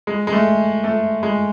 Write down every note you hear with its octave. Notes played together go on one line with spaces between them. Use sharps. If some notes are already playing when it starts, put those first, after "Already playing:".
G#3
G#3
A3
A3
G#3